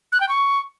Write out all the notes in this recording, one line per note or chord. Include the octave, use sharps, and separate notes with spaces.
F#6
G5
C#6